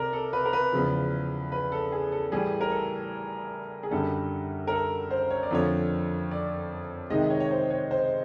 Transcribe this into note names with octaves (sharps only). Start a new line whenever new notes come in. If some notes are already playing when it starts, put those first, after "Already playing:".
Already playing: C3 A#4 D5
A4
B4
A#4
B4
E2 C#3 F3
B4
A4
G#4
A4
A2 E3 G3 G#4
A#4
A4
G#4
F#2 D3 G3 A4
A#4
A4
C5
C#5
D5
F2 D3 F3 A3 C#5
D5
C3 D#3 G#3 D#5
C#5
C#5
C5
C#5
C5